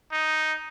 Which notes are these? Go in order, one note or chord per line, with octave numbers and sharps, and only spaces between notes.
D#4